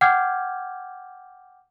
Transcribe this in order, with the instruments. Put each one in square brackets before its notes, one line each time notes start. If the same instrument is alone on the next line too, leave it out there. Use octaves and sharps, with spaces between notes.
[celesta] F#5 G5 D6 F6 G6 G#6